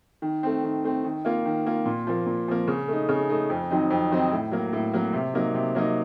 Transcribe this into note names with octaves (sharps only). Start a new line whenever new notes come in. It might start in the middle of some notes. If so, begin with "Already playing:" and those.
D#3
A3 C4
D#3
A3 C4
D#3
A#3 F4
D#3
A#3 F4
A#2
F3 A#3
A#2
F3 A#3
C#3
A3 D#4
C#3
A3 D#4
F2
D#3 F#3 C4 D#4
F2
D#3 F#3 C4 D#4
A2
F#3 A#3
A2
F#3 A#3
C3
F#3 A#3 D#4
C3
F#3 A#3 D#4